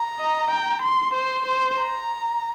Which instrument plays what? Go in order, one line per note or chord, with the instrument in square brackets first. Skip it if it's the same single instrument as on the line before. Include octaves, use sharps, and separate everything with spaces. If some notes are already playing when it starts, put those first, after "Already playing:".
Already playing: [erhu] A#5
[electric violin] D#5
G5
C6
[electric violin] C5 [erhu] C6
[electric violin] C5
[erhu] A#5